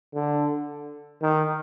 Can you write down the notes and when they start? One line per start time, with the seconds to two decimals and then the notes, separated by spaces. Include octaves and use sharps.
0.14 D3
1.22 D#3